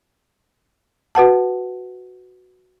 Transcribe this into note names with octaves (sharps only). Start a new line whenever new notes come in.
F#4 B4 F#5 A5